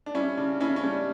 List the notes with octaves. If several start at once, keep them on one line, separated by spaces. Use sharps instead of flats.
D4
G3 C#4 E4
C#3 D4
C#3 C#4 E4
C#4
G3 D4